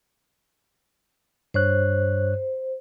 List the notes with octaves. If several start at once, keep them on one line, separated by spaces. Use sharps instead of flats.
G2 C5 C#5 F#6